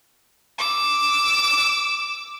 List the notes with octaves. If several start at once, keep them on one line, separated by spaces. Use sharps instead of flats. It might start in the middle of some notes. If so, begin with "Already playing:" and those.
D6 E6